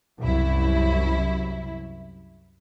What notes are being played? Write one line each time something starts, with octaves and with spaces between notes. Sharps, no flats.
C2 F#2 E4